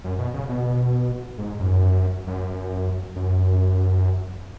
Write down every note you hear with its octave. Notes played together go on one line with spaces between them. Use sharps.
F#2
B2
C#3
B2
G#2
F#2
F#2
F#2